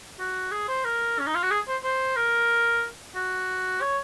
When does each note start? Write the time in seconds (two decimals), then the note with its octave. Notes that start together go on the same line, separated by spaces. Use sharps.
0.19 F#4
0.51 G#4
0.68 C5
0.85 A#4
1.19 C#4
1.27 D#4
1.35 F4
1.43 F#4
1.51 G#4
1.68 C5
1.83 C5
2.16 A#4
3.15 F#4
3.81 C#5